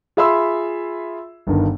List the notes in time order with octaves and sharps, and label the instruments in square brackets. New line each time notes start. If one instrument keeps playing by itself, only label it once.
[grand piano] F4 G#4 E5 B5 C6 E6
G1 G2 D#3